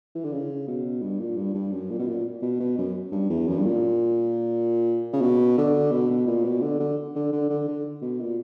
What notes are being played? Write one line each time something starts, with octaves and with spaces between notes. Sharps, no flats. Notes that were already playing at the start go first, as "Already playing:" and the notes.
E3
D3
C#3
B2
G2
A#2
G2
G2
F#2
A#2
B2
A#2
B2
B2
F#2
G2
E2
F#2
G2
A#2
C#3
B2
D3
B2
B2
A#2
B2
D3
D3
D3
D3
D3
D3
B2
A#2